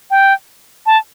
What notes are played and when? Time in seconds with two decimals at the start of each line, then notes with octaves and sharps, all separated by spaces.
0.11 G5
0.86 A5